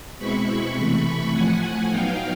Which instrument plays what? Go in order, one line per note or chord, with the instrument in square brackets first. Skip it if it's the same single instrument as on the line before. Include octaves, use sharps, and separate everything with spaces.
[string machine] B2 G#3 C4 E4 B5 C#6
C3 E3 A3 B5 C#6
A2 F3 A3 F#5 G#5
F#3 B3 D#4 F5 G5